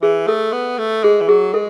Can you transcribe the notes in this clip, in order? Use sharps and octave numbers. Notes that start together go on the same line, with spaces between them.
E3 G#4
A3 A4
B3
A3
G#3 G#4
E3
F#3 G#4
G#3 A4